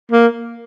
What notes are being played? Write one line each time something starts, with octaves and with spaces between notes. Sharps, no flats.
A#3